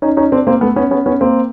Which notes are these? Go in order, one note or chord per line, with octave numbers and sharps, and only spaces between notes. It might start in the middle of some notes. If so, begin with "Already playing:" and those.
C#4 D#4
C#4 D#4
C4 D4
A#3 C4
A3 B3
B3 C#4
B3 C#4
B3 C#4
A#3 C4